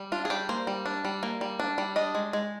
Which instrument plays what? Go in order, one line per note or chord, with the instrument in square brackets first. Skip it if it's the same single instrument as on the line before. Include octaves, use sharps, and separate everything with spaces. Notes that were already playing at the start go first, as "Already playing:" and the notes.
Already playing: [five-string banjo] G3
D4 F4
G#4
G3 G4
A#3 C5
G3
D4
G3
A#3
G3
D4
G3
D4 D#5
G#3
G#3